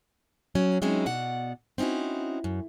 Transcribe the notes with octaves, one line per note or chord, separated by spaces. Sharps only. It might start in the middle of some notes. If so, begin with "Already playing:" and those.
F#3 C#4
F#3 G#3 C4 C#4 D#4 E4
B2 D5 F#5
C4 C#4 D#4 E4 F#4
F#2